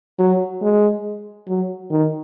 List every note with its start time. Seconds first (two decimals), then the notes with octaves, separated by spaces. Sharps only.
0.19 F#3
0.62 G#3
1.48 F#3
1.91 D#3